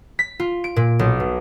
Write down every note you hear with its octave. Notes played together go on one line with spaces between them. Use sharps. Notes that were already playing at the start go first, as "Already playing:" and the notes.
B6
F4
D7
A#2
B1
B2